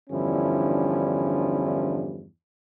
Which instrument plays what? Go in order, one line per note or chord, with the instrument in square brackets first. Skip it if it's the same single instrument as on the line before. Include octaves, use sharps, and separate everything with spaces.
[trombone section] E2 G2 D3 F3 C#4 E4